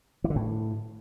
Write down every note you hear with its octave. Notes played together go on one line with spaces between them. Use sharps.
E3
D3
A2